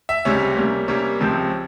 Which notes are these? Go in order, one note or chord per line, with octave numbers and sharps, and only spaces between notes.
E5
C#2 C3 G3 C#4
C3 G3 A#3 C#4
C3 G3 A#3 C#4 C#5
C#2 C3 F3 C4